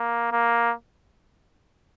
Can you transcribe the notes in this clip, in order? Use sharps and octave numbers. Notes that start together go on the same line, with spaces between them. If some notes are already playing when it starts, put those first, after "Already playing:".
Already playing: A#3
A#3